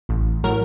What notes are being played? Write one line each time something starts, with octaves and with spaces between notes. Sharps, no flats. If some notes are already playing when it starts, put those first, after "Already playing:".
A1
A2 F#3 A#4